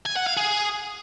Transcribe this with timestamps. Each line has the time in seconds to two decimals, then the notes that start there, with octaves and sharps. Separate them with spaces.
0.06 G#5
0.17 F#5
0.27 F5
0.37 G#4